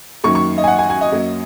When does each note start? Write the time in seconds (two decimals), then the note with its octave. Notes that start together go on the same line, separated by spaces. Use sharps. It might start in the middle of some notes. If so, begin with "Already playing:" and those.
0.24 F#2 D#3 F#3 A#3 C#6
0.35 C#6
0.58 D#5
0.64 G#5
0.68 F#5
0.79 G#5
0.90 G#5
1.01 D#5
1.12 F#2 F#3 A#3